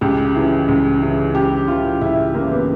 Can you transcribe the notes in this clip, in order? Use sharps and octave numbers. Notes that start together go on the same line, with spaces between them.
C#2 G4
C#3 E3
C#2
C#3 E3
C#2 G4
C#3 E3 F4
C#2 E4
C#3 E3 A#3
B3